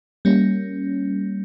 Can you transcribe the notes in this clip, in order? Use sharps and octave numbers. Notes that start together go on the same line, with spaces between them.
G3 A#3 C#4